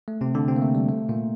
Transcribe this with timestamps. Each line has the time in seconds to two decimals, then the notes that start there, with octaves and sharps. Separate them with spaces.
0.08 A3
0.21 C3 C4
0.35 D3 D4
0.48 C3 C4
0.56 A#3
0.62 A3
0.75 G3
0.89 A3
1.09 A#2 A#3